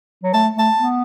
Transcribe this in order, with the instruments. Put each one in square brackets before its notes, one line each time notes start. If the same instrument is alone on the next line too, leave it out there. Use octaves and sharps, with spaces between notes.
[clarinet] F#3
[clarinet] A3 [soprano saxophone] A5
[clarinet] A3 [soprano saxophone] A5
[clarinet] B3